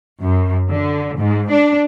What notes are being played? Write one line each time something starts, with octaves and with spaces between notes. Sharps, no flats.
F#2
D3
G#2
D4